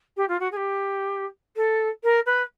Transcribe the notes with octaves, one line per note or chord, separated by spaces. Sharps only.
G4
F4
F#4
G#4
G4
A4
A#4
B4